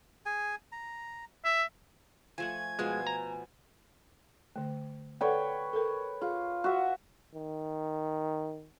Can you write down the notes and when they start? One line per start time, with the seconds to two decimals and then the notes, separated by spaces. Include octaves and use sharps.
0.26 G#4 G#5
0.72 A#5
1.45 E5 E6
2.38 F3 A3 F#5 G#5 G#6
2.79 B2 F3 G#3 C6
3.07 A#5
4.56 D3 A3
5.21 A4 B4 C#5 D5 F#5 G5
5.73 A4 A#4
6.22 F4 G#4
6.64 F#4 E5
7.34 D#3